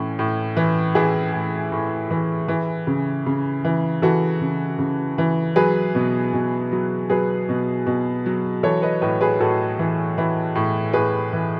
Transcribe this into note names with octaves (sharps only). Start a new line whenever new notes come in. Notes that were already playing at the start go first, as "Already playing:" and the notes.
Already playing: A2 E3 C#4
A2
E3
E3 E4 G#4
A2
A2
E3
E3
C#3
C#3
E3
E3 F#4 A4
C#3
C#3
E3
F#3 G#4 B4
B2
B2
F#3
F#3 G#4 B4
B2
B2
F#3
E3 A4 C#5
B4 D#5
A2 B4 D#5
G#4 B4
A2 F#4 A4
E3
E3
A2
A2 G#4 B4
E3